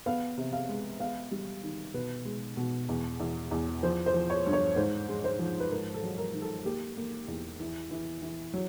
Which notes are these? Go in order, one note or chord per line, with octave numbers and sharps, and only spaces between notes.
B3 F5
C3
F5
G#3
B3 F5
G3
D#3
B2 B4
G#3
B2
E2
E2
E2
F3 C5
C5
F3
C#5
G2
C#5
G#2 C5
G#3
C5
F3
B4
G#2 A#4
A4
F#3
A#4
D#3
A4
A#3 G4
A#3
E2
E3
E3
E3
F#3